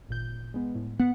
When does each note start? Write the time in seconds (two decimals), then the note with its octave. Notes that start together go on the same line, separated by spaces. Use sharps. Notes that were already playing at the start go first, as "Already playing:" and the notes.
0.09 G#1 A#2 G6
0.54 G#3 B3
0.75 A2
0.99 B3 F#5